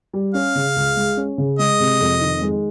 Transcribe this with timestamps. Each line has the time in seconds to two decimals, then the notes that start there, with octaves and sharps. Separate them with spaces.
0.14 G3
0.34 C#4 F5
0.55 C#3
0.76 C#2
0.97 G#3
1.17 C#4
1.38 C#3
1.59 G#3 D#5
1.80 C3
2.01 F2
2.21 D#3
2.42 G#3